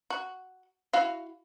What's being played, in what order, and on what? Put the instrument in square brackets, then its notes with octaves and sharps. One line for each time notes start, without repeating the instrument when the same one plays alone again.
[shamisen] F#4
E4 F#4 F5